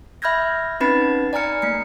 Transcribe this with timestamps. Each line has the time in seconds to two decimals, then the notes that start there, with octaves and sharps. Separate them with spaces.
0.22 E5 B5 F6 G6 G#6 A#6
0.80 C4 C#4 D#4 B4 B5 A6
1.33 D5 G#5 A#5 F6 C#7
1.62 A3 A#3 C#7